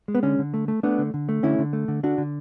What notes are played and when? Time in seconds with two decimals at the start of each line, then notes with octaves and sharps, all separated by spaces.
0.08 G#3
0.15 B3
0.23 D3 C#4
0.39 D3
0.54 A3
0.68 A3
0.83 A3 B3 D4
0.99 D3
1.14 D3
1.29 A3
1.43 D3 C#4 E4
1.59 D3
1.73 A3
1.88 D3
2.03 D3 D4 F#4
2.18 D3